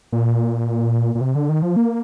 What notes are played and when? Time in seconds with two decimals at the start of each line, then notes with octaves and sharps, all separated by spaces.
0.12 A#2
1.15 A#2
1.21 C3
1.35 D3
1.49 D#3
1.62 F3
1.76 A#3